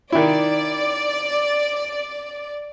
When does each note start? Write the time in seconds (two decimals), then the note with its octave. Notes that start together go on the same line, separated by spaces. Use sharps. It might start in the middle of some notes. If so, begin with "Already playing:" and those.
0.12 D#3 E4 D5